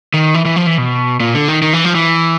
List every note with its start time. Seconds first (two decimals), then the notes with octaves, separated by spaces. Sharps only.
0.14 D#3
0.34 E3
0.45 E3
0.56 F3
0.67 E3
0.78 B2
1.20 A#2
1.35 D3
1.48 D#3
1.62 D#3
1.73 E3
1.84 F3
1.95 E3